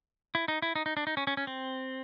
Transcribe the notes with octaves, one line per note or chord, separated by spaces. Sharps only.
E4
D#4
E4
D#4
D#4
D4
D#4
C#4
C#4
C#4
C4